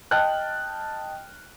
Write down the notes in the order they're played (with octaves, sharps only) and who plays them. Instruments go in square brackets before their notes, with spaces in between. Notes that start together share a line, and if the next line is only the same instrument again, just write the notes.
[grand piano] D#5 G5 A5 F6 F#6